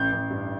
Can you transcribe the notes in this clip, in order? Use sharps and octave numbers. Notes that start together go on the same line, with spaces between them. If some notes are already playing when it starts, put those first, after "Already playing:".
Already playing: A1 G6
A1
G2